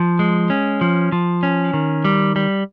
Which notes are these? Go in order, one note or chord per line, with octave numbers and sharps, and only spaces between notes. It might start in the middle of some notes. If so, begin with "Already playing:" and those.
Already playing: F3
G#3
C#4
F3
F3
C#4
D#3
G3
G3